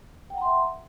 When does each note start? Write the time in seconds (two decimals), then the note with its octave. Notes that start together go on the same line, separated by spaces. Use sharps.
0.30 G5
0.34 F#5
0.38 A#5
0.41 C6
0.45 E5